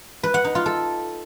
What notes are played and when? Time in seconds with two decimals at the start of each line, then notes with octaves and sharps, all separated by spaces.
0.23 B4
0.34 F#5
0.45 D#4
0.55 F4
0.66 A4